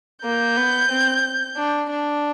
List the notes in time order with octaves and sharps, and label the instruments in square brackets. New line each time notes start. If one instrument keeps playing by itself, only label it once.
[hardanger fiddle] A#3 [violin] G6
[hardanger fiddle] B3
C4
D4
D4